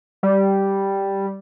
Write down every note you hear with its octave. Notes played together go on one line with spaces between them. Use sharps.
G3